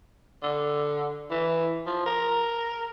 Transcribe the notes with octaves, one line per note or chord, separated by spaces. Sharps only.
D3
E3
F3
A#4